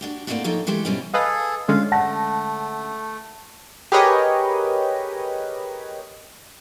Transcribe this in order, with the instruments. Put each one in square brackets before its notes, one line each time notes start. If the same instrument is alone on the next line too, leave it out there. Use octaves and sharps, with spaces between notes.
[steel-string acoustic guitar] D4 F#4 G4
A2 A3 A#3 C4 D5 F#5
F3 C#4 D#4 G4 A4 A#4
E3 G#3 A3 G4 A4
B2 G3 C4 C#4 E4
[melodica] G#4 A4 [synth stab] B4 D#5 F5
[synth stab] D3 G#3 C#4 [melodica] F4 F5
[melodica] A3 [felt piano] F#5 A5 A#6
[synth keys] G4 G#4 A#4 B4 C#5 D#5